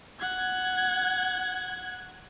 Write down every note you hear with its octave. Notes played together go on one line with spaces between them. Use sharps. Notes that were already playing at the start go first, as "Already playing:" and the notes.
F#5 G#6